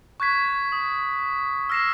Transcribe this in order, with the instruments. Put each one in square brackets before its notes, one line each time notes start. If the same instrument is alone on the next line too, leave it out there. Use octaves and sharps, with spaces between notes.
[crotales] C#6 F#6 G#6 B6
D#6
E6 F6 A#6 C7 E7